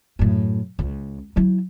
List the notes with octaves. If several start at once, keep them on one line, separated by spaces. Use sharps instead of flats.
F#2 A2
C#2
F#3 E4